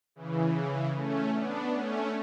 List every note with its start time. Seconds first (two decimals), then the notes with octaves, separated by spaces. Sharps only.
0.16 C#3 E3
0.95 A3 C#4
1.34 B3 D4
1.74 A3 C#4